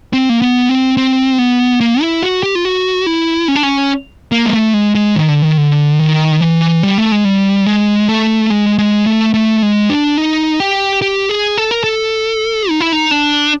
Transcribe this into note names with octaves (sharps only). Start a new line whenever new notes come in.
C4
A#3
B3
C4
C4
B3
A#3
E4
F#4
G4
F4
F#4
E4
C#4
D4
C#4
A#3
G#3
A3
G#3
G#3
D#3
D3
D#3
D3
D#3
E3
G3
A3
G#3
G3
G#3
A3
G#3
G#3
A3
A3
G#3
D4
D#4
G4
G4
G#4
A4
A#4
A4
D#4
E4
D#4
D4